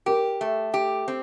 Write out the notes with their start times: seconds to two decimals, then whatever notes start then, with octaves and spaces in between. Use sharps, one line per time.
0.06 G4 A#4
0.41 A3
0.74 G4
1.08 C4